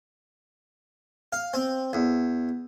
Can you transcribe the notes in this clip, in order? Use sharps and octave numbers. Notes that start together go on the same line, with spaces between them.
F5
C4
E2